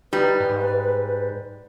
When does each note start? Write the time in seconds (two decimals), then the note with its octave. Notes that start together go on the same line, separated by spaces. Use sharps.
0.13 G3 D#4 B4
0.40 G#2